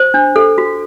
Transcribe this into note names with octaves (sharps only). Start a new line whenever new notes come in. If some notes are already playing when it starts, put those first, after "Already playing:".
Already playing: C5
D4
A4
F#4